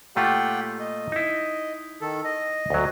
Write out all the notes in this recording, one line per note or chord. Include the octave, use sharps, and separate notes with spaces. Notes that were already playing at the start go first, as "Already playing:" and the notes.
A#2 A3 F4 G4 F#5 G5
D#5
D#4 E4
D#3 A4
D#5
D2 F#3